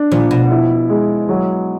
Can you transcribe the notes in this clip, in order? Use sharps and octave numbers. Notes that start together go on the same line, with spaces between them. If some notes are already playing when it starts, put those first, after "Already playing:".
Already playing: D4
A#2 F3
B2
E4
G#3
F#3